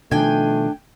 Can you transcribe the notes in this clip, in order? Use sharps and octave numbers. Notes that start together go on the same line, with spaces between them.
B2 D#3 F3 A3 D4 G5 G#5